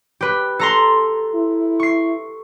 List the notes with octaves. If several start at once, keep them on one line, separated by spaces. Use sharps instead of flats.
G4 B4
A4 A#5 C6
E4
C#6 C7